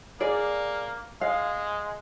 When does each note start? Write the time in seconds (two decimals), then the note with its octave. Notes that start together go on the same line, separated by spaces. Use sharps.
0.20 A#3 G#4 D5
1.21 G#3 F5